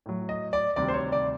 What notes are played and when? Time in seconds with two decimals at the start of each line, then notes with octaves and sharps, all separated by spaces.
0.06 A2 F#3
0.29 D#5
0.53 D5
0.76 D2 C3 D#3 G3 D5
0.88 C5
0.94 C#5
1.12 D5